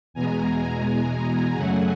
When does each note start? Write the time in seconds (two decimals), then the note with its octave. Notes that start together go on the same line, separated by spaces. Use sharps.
0.14 E2 B2 G#3 G#5 A#5
1.54 F#2 C#3 F#3 A3 F#5 G#5